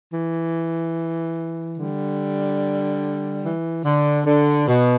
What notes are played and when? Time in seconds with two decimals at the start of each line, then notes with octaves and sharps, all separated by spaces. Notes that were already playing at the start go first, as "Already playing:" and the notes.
0.12 E3
1.77 D3 G3
3.43 E3
3.84 D3
4.25 D3
4.67 B2